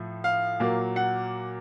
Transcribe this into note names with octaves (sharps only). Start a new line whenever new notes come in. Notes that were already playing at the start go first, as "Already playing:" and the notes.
Already playing: A2 F3
F5
A#2 F#3 A#3
F#5